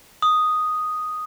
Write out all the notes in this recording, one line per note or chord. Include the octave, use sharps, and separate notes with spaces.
D#6